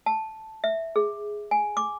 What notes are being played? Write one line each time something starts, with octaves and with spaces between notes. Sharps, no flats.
A5
E5
G#4
G#5
D6